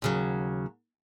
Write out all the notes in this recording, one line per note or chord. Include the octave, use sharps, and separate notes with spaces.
D#2 C#3 F#3